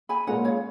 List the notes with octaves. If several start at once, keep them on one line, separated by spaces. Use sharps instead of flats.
G#5 B5
A#2 G#3 C#4 F#5 A#5
C#5 F5